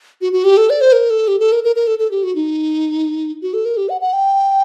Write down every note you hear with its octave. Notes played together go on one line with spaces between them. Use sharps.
F#4
F#4
G4
A4
D5
C5
A#4
A4
G4
A4
A#4
A#4
A#4
A4
A4
G4
F#4
D#4
F#4
A4
A#4
G4
F#5
F#5
G5